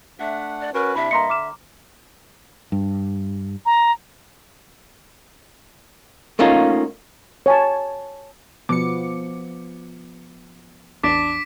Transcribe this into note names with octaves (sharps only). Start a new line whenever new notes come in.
A3 D4 E5 F#5
D5
C#4 F#4 A#4 B4
C3 D4 E4 E5 B5
G2 A#3 D#5 A#5 C6 C#7
D3 D6 F6 E7
G2
A#5
A3 A#3 C#4 D#4 F4
C#5 G#5 A5
B2 F3 B3 D6 C#7
A1 E2 D4 D6 B6 D7